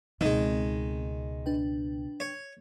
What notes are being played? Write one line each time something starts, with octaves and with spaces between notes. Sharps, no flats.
C#2 B2 D#3 G#3 C4 D#4
D4 B4 G5
C#5